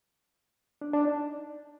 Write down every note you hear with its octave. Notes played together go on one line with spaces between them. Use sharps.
D4
D4
D#4